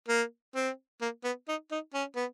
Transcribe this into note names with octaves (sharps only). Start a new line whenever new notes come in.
A#3
C4
A#3
B3
D#4
D#4
C#4
B3